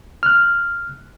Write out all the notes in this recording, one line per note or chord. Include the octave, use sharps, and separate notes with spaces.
F6 F#6